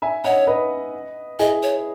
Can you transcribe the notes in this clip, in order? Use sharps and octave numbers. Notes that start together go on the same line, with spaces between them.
E5 G#5
C#5 D#5 F#5
B4 D#5
E4 G#4 D#5
C#5